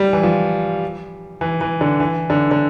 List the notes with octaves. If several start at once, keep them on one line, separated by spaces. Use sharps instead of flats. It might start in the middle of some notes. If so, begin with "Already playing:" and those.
Already playing: G3
E3
F3
E3
E3
D3
E3
D3
D3